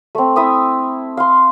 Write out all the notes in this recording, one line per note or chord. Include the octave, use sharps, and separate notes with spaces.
A3 C4
E4 E5 D#6 E6
F5 C6